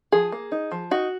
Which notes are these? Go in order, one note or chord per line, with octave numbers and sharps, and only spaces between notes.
F3 G#4
A#3
D#4
F3
D#4 F#4